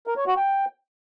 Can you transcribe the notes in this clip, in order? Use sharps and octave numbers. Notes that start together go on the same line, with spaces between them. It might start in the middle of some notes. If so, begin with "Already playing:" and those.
A#4
C#5
F#4
G5